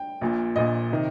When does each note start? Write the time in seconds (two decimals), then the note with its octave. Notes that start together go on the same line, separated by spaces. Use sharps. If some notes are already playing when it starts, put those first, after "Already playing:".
Already playing: G5
0.21 A#1 A#2
0.56 A#1 A#2 D#5
0.92 C3 D#3